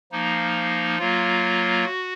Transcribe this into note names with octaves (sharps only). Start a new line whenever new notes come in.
F3 A#3 D#4
F#3 A#3 F4
F#4